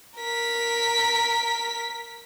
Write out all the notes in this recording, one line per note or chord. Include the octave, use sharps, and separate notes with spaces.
A#4 B6